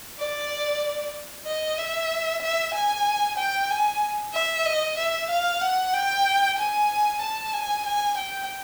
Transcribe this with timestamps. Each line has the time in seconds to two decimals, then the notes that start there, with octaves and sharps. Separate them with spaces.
0.18 D5
1.46 D#5
1.78 E5
2.42 E5
2.74 G#5
3.38 G5
3.70 G#5
4.33 E5
4.65 D#5
4.98 E5
5.30 F5
5.61 F#5
5.93 G5
6.58 G#5
7.22 A5
7.53 G#5
7.85 G#5
8.18 G5